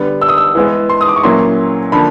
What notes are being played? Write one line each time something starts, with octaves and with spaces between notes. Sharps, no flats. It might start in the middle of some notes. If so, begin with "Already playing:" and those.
Already playing: D3 G3 B3
E6
D#6
E6
E3 G#3 B3
C6
D#6
D6
C#6
A#2 F#3 A#3 C#4 E4 C6
D3 F3 A#3 B5